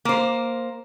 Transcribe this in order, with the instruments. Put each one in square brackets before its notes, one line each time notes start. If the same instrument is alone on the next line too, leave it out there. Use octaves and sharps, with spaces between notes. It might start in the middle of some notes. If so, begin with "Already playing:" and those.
[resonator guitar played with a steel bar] A#3 C5